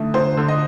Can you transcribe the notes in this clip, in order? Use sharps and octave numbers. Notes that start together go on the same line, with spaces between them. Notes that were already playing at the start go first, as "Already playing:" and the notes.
Already playing: D3 A3 D#4
D3 C5
D3
D#5